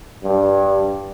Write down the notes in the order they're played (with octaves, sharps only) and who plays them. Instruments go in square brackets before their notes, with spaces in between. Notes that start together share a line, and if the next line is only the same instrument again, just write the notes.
[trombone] G2